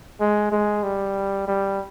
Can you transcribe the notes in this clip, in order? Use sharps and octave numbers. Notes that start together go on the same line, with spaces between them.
G#3
G#3
G3
G3